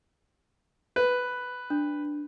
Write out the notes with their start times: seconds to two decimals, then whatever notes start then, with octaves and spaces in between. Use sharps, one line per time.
0.96 B4
1.70 D4